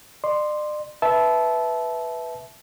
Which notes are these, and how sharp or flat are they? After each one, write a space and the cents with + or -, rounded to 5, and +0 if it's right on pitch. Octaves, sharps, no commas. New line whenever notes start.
D5 +40 C6 +0
B4 +0 E5 -5 A5 -20